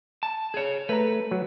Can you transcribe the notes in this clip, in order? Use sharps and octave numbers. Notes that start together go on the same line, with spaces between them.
A5
G#4 C#5
A3 B4 A#5
F#3